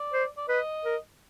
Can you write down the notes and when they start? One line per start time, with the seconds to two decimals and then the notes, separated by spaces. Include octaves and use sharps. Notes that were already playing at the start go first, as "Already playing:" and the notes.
Already playing: D5
0.13 C5
0.37 D5
0.48 B4 D#5
0.85 A#4